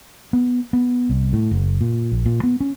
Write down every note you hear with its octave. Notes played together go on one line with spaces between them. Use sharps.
B3
B3
C2
A2
F#1
A#2
A#1
A#2
B3
C#4